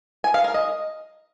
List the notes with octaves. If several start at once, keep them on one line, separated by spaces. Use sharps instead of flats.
G#5
F5
A#4
D#5